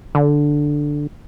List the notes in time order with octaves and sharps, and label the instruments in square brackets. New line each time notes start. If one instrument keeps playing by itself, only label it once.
[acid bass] D3